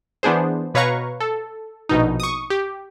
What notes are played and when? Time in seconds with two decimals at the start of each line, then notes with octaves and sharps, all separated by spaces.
0.23 E3 B3 D4 G#4 C5
0.74 B2 B4 C#5 F5 A#5 C#6
1.20 A4
1.89 A#1 B2 D#4
2.20 C#6 D#6
2.50 G4